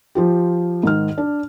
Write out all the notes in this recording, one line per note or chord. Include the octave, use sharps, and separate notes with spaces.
F3 F4 G4
G#2 D#3 F6
D4